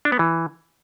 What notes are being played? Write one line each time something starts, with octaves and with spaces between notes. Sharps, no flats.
D4
B3
E3